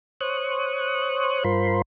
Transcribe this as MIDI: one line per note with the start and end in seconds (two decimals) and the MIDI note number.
0.21 1.44 72
0.21 1.44 73
0.21 1.44 85
0.21 1.44 87
0.21 1.44 90
1.44 1.82 43
1.44 1.82 65
1.44 1.82 70
1.44 1.82 72
1.44 1.82 83
1.44 1.82 84